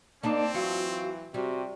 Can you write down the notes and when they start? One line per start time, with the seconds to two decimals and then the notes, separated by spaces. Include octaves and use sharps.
0.23 A#3 C4 D4 D#4 D5 A5
0.54 E3 F#3 F4 F#4
1.34 C3 G3 F#4